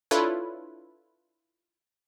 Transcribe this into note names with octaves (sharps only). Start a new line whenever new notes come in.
D4 E4 F4 A4 B4 C#5